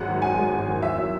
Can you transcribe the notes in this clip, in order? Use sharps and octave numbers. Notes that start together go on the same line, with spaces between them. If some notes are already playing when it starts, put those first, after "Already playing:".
Already playing: G#1 F#2 G#3 F#5
D#3
F#2 G#5
G#3
G#1
D#3
E2 E5
F#3